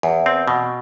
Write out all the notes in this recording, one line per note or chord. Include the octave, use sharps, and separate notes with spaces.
E2
C4
B2